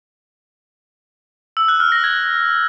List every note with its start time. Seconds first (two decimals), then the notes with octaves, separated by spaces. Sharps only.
1.57 E6
1.68 F#6
1.80 F6
1.92 A#6
2.04 G#6